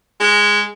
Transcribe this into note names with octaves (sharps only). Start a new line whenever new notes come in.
G#3